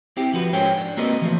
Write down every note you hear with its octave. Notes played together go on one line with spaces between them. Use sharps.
C4 E4 G4
F3 F#4 B4
G#2 C#4 A#4 C5 C#5 G5
D4
A#3 C4 F#4 A#4 B4 D#5
E3 F3 A3 A#3